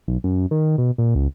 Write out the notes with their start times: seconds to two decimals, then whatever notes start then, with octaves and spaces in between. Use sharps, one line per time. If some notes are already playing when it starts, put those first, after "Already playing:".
0.08 B1
0.24 F#2
0.51 D#3
0.78 B2
0.98 A#2
1.15 C#2